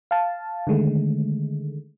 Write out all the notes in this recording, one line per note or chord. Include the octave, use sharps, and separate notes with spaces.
F5 A5
D3 D#3 G#3 A3